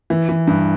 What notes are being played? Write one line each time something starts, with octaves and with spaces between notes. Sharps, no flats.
E3
E3
G2